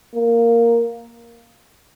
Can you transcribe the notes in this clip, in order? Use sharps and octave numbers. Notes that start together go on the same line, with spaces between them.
A#3